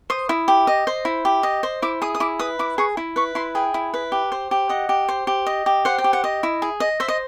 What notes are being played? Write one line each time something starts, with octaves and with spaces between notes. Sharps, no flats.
C5 D#6
E4
G4
D#5
C5
E4
G4
D#5
C5
E4 D6
G#4 D#6
D#6
E4 D6
B4 D#6
E4 D6
G#4 C#6
E4
B4 C#6
E4 C6
G#4 G5
E4
B4
G4
C5
G4
D#5 F#5
G4
C5
G4
D#5
G4
C5 F#5
G5
G4
F#5
D#5
E4
G#4
D#5
C5 E5
D#5